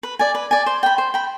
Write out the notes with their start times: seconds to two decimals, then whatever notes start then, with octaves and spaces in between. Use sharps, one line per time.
0.03 B4
0.19 D5 G#5
0.35 B4
0.51 D5 G#5
0.66 C5
0.83 G5 B5
0.98 C5
1.14 G5 B5